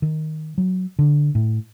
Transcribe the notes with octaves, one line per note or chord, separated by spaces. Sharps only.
D#3
F#3
D3
A2